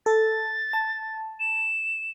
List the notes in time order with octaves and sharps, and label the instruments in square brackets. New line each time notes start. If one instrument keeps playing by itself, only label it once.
[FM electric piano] A4 [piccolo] A6
[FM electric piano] A5
[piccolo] E7